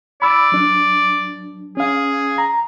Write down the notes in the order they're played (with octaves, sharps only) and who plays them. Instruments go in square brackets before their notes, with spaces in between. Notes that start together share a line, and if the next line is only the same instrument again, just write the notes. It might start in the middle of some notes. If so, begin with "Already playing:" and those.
[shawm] D5 [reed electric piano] B5 E6
[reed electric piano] F#3 D4
[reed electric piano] C#4 F5 [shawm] G#4
[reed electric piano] A#5